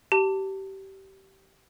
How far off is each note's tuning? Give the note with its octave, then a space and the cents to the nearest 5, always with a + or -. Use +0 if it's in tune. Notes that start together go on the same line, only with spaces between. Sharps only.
G4 -25 A5 +20